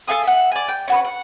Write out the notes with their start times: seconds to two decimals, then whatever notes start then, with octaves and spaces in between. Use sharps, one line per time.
0.07 A4 F5 G#5 D#6
0.24 E5 F#5
0.51 D5 G#5
0.68 G5
0.88 C#4 F#4 B4
1.05 F#5